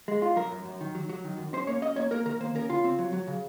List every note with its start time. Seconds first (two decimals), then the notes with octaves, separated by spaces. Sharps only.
0.08 G#3
0.22 F4
0.36 F#3 A#4
0.52 F#2
0.65 F#2
0.81 D#3
0.95 F#3
1.09 F#3
1.24 D#3
1.38 F#2
1.53 C#4 C5
1.67 A#3 C#5
1.82 C#4 D#5
1.96 A#3 C#5
2.11 A#3 A#4
2.26 D#3 A#4
2.40 A#3 C5
2.55 C#4 A#4
2.70 C#3 F4
2.84 C4
2.99 F#3
3.13 F#3
3.27 C#3